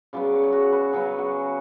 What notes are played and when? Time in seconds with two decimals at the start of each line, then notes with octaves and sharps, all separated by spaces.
0.13 C#3 F#3 B3 D5
0.34 C#5
0.43 G#4
0.52 F#4
0.72 B4
0.93 C#3 F#3 B3 G#4
1.18 F#4